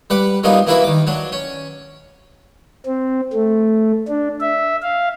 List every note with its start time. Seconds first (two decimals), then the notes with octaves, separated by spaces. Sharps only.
0.10 G3 B4 F#5 D6
0.44 F#3 G3 A#3 B3 D#4 F4
0.67 E3 A#3 D4 E4 F#4 B4
0.84 D#3 D6
1.07 F#3 D4
1.32 C#4
2.86 C4
3.33 A3
4.08 D4
4.40 E5
4.82 F5